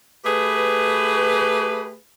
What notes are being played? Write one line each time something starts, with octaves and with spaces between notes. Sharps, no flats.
A3 G4 G#4 B4